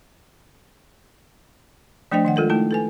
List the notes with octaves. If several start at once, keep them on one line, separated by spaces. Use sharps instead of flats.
F3 A3 D4 C5 D#5 G5
D#3 D#5 F#5
G#3 F4 A4 A#4
A3 D#4 E4 A5
A4 B4 G#5